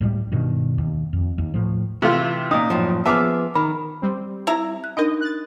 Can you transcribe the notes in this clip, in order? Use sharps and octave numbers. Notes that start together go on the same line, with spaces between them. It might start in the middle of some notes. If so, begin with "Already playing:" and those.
C#2 A2 G3
G2 B2 D#3
D#2
F2
D#2
A2 F3
C3 E3 A3 F4
A#2 C#4 D#4 D#6
F#2 A2 F3
F3 B3 G#4 E5 A5 D6 F6
D#3 B5
G3 C4
E4 A#5
F#6
D4 D#4 A#4 D#5
F#6 A6